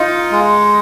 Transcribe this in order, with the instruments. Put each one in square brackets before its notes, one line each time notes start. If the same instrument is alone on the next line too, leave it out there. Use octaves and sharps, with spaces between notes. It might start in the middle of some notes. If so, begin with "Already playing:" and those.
Already playing: [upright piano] D#4 [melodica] F4
[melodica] G#3